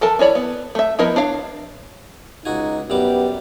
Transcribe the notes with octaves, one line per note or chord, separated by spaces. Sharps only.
E3 A4 A#4 A5
C#4 E4 C#5 D5
B3
A3 E5
F3 B3 E4 A#4 D#5
D4 C#5 F5
C#2 D#4 F#4 G#5
F#2 G3 B3 G4 D6